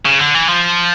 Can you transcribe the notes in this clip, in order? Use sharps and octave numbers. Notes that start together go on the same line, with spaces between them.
C#3
D3
E3
F3